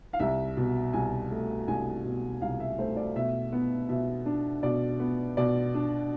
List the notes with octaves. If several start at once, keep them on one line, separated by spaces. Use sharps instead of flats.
F5
C2 E5
B2
C2 G#5
A3
C2 G#5
B2
C2 F5
E5
A3 C5
D5
B2 E5
B3
B2 E5
D4
B2 D5
B3
B2 D5
D4